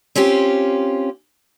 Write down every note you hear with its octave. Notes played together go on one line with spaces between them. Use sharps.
C4 C#4 F4 G4